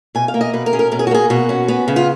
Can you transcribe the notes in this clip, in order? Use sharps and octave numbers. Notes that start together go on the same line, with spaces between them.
B2 G#5
F5
A#3
D#5
B2 B4
A#4
C#4 G#4
A#4
B2 A#4
G#4
F#4
A#3 G#4
B2 F#4
C#4
B3
C#3
F4